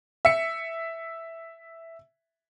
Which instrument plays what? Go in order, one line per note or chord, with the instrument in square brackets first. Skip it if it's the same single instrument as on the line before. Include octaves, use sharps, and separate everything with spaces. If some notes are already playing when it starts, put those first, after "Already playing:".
[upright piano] E5 C#7